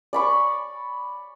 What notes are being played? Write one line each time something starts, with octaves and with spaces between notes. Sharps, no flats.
D5 B5 C#6